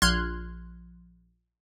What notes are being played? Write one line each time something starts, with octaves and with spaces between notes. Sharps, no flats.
A#1 C6 F6 F#6 G#6